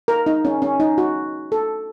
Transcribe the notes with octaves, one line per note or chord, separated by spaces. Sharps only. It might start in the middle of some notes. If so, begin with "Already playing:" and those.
A#4
D#4
C#4
C#4
D#4
F#4
A4